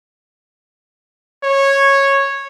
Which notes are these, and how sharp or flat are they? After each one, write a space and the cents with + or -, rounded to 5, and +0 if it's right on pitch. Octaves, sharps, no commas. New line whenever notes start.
C#5 -10